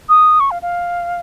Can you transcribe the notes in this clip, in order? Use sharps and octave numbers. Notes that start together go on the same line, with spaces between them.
D#6
C#6
F5
F5